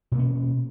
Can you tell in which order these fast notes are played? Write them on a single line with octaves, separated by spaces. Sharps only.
B2 A#3 C#4